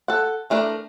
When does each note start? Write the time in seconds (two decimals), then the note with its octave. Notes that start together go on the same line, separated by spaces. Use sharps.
0.08 A4 F#5
0.50 E3 A3 D4 A#4